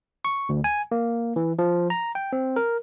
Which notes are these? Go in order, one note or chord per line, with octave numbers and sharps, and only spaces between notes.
C#6
D2
G#5
A#3
E3
F3
A#5
G5
C4
A#4